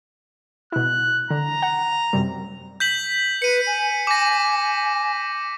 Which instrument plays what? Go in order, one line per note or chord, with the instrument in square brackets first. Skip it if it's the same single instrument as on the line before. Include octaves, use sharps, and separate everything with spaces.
[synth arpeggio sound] B2 E4 [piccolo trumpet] F#6
[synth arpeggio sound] D3 [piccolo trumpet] A#5
[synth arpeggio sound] F#5
F#2 C3 G3
[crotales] G6 B6 F#7
[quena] B4 [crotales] C#7 D#7
[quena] G#5
[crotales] D6 A#6